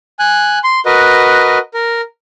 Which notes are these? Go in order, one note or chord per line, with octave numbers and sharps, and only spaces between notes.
G#5 F#6
C6
F#4 A#4 B4 D#5
A#4